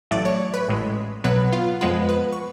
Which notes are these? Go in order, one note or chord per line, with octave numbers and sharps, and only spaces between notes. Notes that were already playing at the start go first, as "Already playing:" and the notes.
A1 A2 F#3 A3 D5
C#5 C#6
B4 B5
A1 A2 G#3
B1 B2 F#3 B3 B4 B5
F4 F5
F2 F3 G#3 B3 F4 B4 B5
B4 B5
C#6